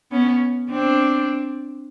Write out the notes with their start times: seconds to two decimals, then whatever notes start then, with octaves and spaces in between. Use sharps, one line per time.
0.11 B3 C#4
0.70 C4 D4